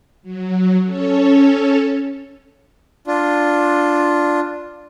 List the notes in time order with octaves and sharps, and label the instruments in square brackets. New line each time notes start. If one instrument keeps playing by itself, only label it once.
[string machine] F#3
C#4 A4 C#5
[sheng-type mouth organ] D4 F4